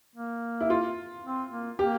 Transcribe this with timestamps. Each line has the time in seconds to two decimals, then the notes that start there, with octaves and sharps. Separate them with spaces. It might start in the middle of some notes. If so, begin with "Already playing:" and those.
0.16 A#3
0.61 E4
0.70 F4
1.24 C4
1.52 A#3
1.79 A#3 G4